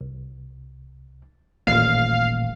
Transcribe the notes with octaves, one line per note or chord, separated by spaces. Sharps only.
C2
D#1 A1 A#2 F5